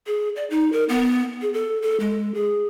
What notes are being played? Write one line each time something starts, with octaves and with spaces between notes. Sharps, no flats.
G#4
D5
D#4
A#4
B3
G#4
A4
A4
G#3
G#4